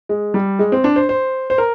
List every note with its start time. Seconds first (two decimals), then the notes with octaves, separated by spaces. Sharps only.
0.09 G#3
0.34 G3
0.59 G#3
0.72 C4
0.84 D4
0.96 C5
1.09 C5
1.50 C5
1.58 A#4